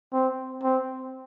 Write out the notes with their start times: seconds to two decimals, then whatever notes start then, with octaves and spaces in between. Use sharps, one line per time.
0.13 C4
0.64 C4